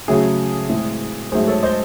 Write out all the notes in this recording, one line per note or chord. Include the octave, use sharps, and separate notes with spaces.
C#3 F#3 A3 G#4
A2 E3 G#3 C4
G#2 F#3 A3 G#4 C5
A4 C#5
C5 D#5